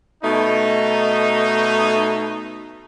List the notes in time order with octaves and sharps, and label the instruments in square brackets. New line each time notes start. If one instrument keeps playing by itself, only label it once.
[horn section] B2 A3 D#4